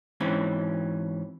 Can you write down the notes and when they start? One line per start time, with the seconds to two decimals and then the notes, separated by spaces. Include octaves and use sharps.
0.20 G#2 E3 C4 C#4